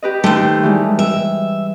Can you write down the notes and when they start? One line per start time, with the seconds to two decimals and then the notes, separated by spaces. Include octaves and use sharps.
0.02 G4 B4 D#5
0.24 D#2 A3 C5 G5
0.63 E3 G3 G#3
0.99 E5